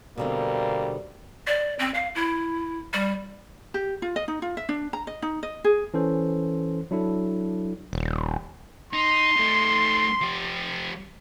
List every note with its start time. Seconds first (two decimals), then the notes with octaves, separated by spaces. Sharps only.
0.18 B2 D3 G3 A#3 C4
1.47 D5
1.79 C4
1.94 F5
2.15 E4
2.94 G3
3.74 G4
4.02 F4
4.16 D#5
4.28 D#4
4.42 F4
4.57 E5
4.69 D4
4.93 A#5
5.07 D#5
5.22 D#4
5.43 D#5
5.64 G#4
5.94 E3 C#4 A4 C5
6.91 F#3 D4 E4 A4
7.93 D#1
8.93 D#4 C6
9.37 A3 D#4
10.21 F3 G4